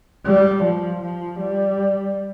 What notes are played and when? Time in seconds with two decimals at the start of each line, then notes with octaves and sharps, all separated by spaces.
0.25 G3
0.64 F3
1.02 F3
1.39 G3